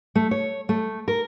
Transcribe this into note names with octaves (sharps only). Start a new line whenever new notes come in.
A3
C#5
A3
A#4